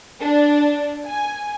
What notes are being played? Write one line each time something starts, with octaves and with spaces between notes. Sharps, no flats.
D4
G#5